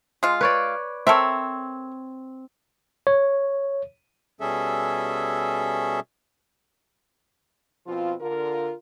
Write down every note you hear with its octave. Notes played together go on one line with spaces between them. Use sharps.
G#3 F4
B4 C#5 D5
C4 A4 A#4 C#5 E5
C#5
B2 G3 C#4 G#4 A4 E5
B2 F3 C4 F4
D3 F4 A#4